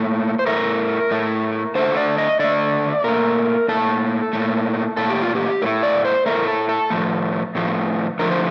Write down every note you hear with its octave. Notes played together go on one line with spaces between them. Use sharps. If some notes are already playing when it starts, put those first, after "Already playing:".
Already playing: A#2 A3 A#4
C5
A2 A3 A#4
A2 A3
D3 A3 C5
D5
D#5
D3 A3 D5
A#2 A3 A#4
A#2 A3 A4
A#2 A3
A#2 A3 A4
G4
F4
G4
A2 A3 A#4
D5
C5
A2 A3 A#4
A4
A4
A2 F3 A3
A2 F3 A3
D3 F3 A3 A#4
C5